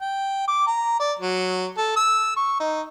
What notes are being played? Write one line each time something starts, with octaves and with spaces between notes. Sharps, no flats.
G5
D6
A#5
D5
F#3
A4
E6
C#6
D#4